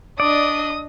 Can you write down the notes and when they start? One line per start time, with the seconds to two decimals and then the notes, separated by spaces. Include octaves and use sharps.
0.20 D4 D5 D#5 D#6